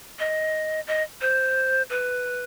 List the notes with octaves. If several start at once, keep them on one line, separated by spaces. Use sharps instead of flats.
D#5
D#5
C5
B4